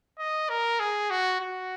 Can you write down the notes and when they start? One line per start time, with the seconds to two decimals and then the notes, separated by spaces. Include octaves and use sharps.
0.19 D#5
0.49 A#4
0.80 G#4
1.10 F#4
1.40 F#4